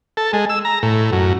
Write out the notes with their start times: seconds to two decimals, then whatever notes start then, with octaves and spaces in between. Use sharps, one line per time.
0.17 A4
0.33 G#3
0.50 E6
0.65 A#5
0.83 A2
1.12 F#2